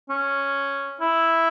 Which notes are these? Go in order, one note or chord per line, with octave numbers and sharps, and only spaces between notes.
C#4
E4